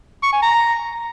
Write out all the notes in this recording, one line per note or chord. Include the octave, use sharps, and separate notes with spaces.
C#6
G#5
A#5